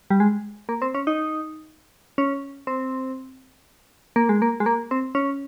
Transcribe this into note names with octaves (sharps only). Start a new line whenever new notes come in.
G3
G#3
A#3
C4
C#4
D#4
C#4
C4
A#3
G#3
A#3
G#3
A#3
C4
C#4